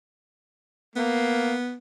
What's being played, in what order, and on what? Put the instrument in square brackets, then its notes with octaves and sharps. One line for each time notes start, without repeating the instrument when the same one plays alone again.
[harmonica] A#3 [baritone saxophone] B3